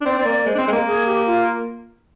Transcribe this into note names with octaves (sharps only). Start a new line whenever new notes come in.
D4
C4 D5
C4
A#3 D5
G#3 C5
D4
C4
G#3
A#3
G#4
G4
F4